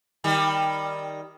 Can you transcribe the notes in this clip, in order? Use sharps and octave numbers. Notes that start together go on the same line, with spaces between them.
D#3 G3